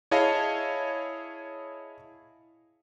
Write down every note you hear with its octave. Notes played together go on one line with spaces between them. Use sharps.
E4 G#4 C#5 D#5 F5 A5